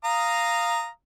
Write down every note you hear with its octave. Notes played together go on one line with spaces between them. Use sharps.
F5 A#5 D#6